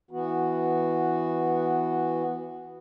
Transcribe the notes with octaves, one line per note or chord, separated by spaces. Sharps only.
E3 B3 F#4